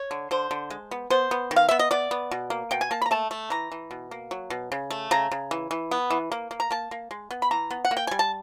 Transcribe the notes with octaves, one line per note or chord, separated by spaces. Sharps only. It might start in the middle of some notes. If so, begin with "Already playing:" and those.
Already playing: C#5
D3
D3 C5
D3
G#3
B3
B3 C5
B3
D#3
F5
B3 E5
D#5
B3 D5
B3
B2
A#3
B2 G5
G#5
A#3 A5
B5
A#5
A3 A5
A3
E3 A#5
E3
B2
A#3
F#3
B2
C#3
A3
C#3 A#5
C#3
E3
E3
B3
E3
A#3
A#3
A#5
A#3 A5
A#3
G#3
B3
B5
E3 A#5
B3
F#5
A#3
G5
G3 G#5
A5